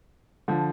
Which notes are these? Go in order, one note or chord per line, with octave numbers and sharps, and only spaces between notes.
D3 F3